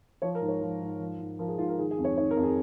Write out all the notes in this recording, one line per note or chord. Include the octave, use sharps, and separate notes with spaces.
F3 C#5
A#4
G#2
C#5
F3
G#2
F3
G#2
F3 A#4
G#4
G#2 F4
A#4
D#3 G#4
G#4
F2
C#5
D#3 C#5
A#4
F2
G#4